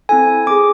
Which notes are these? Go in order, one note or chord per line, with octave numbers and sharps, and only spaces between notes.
C4 E4 A4 G#5
C4 G#4 D6